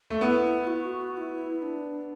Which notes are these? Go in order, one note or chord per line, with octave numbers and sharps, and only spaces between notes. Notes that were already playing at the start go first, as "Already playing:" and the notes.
A3
B3 E4
F#4
F#4
E4
E4
D4